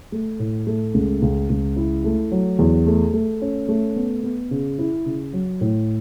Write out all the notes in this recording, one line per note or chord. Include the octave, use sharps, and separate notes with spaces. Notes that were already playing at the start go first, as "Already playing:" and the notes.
A3
A2
A3
C#2
C#2
C#2
E4
A3
F#3
E2
A3
A3
C#4
A3
B3
B3
C#3
E4
C#3
F#3
A2